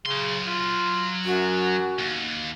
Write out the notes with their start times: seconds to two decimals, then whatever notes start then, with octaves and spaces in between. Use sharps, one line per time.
0.06 C#3 F#3 C6
0.46 F4
1.25 F#2 F#4
1.99 D#2